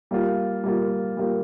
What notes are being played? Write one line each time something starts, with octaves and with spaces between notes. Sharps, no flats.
G3 A#3 F4
G3 A#3 F4
G3 A#3 F4